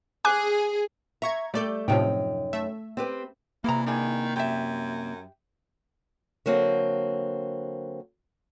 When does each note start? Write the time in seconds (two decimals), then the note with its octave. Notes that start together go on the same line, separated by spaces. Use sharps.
0.25 G#4 G#5 D6 F#6
1.22 E5 A#5 C#6 G#6
1.54 G3 A3 A4 D5 G6
1.88 F#2 A2 C3 F3 D#4 G5
2.53 A3 E5
2.97 C4 G4 B4
3.64 C3 E3 A#3 G#4 A#5
3.86 D#3 D4 E4 G#4
4.36 F#2 G4 E5
6.46 D3 F#3 A#3 C4